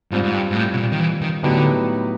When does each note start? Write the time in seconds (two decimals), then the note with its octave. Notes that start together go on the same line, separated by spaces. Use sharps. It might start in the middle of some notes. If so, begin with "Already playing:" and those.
0.11 G#2 G3 C4 F4
0.24 G#2
0.34 G2
0.51 G#2
0.56 A2
0.73 B2
0.78 A#2
0.92 D#3
1.00 E3
1.21 D#3
1.43 A2 D3 F#3 B3 D#4 G4